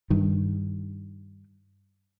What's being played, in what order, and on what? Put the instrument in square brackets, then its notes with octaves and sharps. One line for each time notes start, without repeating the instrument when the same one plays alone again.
[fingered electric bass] G2 D#3